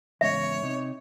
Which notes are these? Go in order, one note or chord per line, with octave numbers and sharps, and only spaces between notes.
E2 G#2 C#3 C#5 E5
C3 D#4